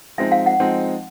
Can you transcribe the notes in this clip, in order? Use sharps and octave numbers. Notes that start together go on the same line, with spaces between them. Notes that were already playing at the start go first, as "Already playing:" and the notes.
F3 G#3 C4 D#4 E5
F5
F#5
F3 G#3 C4 D#4